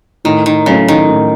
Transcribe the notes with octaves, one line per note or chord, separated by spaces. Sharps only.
A2 D#3
D#3
C#3 F#3 A3 C#4
D#3
A2